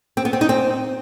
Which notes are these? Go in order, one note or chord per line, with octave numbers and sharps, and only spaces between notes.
C4
B3
C4
D#4
C4